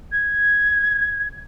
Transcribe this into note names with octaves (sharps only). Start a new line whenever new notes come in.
G#6